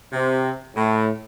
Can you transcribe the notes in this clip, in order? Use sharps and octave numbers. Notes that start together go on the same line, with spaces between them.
C3
A2